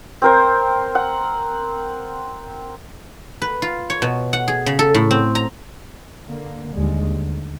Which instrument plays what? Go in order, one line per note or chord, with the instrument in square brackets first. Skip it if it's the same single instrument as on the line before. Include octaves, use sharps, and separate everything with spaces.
[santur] C4 A#4 C5
F#5
[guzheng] B4
F4
C#5
B2
F#5
G#4
C#3
A4
A2
C4
A#5
[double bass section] D3 A#3
D#2 D3 G3 G#3
D2